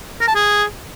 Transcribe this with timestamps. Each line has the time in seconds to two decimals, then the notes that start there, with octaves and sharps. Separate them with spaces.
0.21 A#4
0.28 A5
0.35 G#4